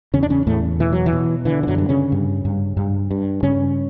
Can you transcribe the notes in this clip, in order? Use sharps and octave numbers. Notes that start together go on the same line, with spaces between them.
E2 C#3 C#4
D4
C#3 C#4
E2 A2 A3
B2 E3
F#3
E3
B2
D3 E3
E3
F#2 F#3
G2
C#3 C#4
G2
G2
G2
G2
G2 C#3 C#4